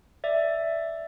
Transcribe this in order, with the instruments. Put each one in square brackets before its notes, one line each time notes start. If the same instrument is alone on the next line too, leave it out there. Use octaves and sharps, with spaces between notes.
[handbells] D5 E5